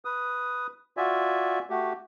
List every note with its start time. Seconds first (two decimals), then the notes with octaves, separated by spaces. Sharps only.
0.05 B4 D#6
0.97 F4 F#4 D5 E5 G#5
1.70 A3 F#4 G4